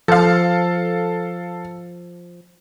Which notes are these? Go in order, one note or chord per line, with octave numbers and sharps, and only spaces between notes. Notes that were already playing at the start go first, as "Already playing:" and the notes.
F3 A4 F5